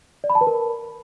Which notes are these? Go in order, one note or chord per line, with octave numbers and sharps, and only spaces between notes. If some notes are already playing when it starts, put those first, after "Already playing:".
D5
B5
A5
B4
A#4